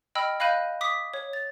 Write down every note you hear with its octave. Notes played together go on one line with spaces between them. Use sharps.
D#5 G5 B5 E6 F6
D#5 F5 B5 F#6 G6 D#7
D6 D#6 B6
C#5
A6